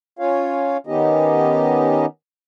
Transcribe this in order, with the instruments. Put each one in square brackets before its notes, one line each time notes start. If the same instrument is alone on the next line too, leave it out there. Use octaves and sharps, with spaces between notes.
[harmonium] C#4 F4 C#5 F5
D#3 B3 C#4 D#4 G4 D#5